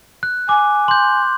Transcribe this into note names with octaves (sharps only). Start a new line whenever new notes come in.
F#6
G#5 D6
C6 G6